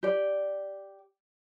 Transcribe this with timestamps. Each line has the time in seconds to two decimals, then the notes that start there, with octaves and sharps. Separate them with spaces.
0.03 G4 D5